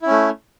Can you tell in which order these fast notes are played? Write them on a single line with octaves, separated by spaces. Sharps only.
E4 C#4 A3